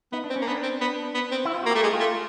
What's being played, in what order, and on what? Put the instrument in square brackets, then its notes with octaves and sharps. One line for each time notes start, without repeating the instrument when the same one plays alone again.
[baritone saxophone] B3 [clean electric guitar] D#4
[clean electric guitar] D4
[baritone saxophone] C4
[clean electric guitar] C#4
[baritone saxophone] A#3
[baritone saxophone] B3 [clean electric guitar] D4
[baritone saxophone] C4
B3
B3
C4
[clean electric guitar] E4
F4
F#4
[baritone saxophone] A#3
[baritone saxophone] A3 [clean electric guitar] G4
[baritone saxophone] G#3
[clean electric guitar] F4
[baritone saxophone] A3